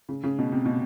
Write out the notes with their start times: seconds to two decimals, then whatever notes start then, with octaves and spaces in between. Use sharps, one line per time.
0.09 C#3
0.23 C#3
0.39 B2
0.52 C3
0.65 B2